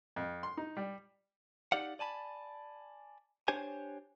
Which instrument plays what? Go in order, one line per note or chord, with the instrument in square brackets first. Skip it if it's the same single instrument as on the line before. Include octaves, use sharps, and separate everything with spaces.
[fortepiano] F2
C6
D#4
G3
[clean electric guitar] D#4 G4 D5 F5 F#5
D5 G#5 A5 B5
D4 G4 C5 C#5 G#5